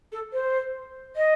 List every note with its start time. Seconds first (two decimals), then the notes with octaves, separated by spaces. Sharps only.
0.12 A4
0.33 C5
1.16 D#5